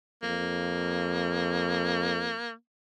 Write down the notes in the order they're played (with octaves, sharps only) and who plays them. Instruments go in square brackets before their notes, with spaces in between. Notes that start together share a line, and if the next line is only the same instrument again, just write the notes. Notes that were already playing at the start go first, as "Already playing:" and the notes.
[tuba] F2 [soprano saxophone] A#3